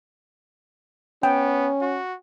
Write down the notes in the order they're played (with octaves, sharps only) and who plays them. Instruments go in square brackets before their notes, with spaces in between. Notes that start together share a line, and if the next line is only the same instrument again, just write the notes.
[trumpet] B3 [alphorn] C#4 [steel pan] G5
[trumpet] F#4